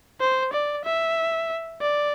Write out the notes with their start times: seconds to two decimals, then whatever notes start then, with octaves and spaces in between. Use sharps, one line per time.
0.21 C5
0.53 D5
0.85 E5
1.81 D5